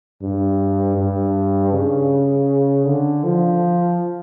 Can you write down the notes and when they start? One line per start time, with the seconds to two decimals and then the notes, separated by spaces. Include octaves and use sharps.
0.22 G2
0.97 G2
1.73 C#3
2.86 D3
3.24 F3